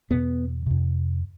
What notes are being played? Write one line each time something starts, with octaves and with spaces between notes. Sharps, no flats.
E2 B2 B3
F2 C3